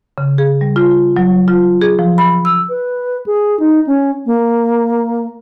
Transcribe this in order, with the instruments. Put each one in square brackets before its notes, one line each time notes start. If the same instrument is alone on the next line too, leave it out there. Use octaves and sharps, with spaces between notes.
[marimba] C#3
G#4
G3
F4
F#3
F4
G#4
F3
B5
E6
[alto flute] B4
G#4
D#4
C#4
A#3